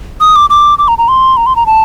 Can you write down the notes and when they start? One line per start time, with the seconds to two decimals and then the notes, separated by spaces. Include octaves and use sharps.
0.21 D#6
0.36 D6
0.50 D6
0.79 D6
0.88 A#5
0.98 A#5
1.08 C6
1.37 A#5
1.46 C6
1.56 A#5
1.66 A5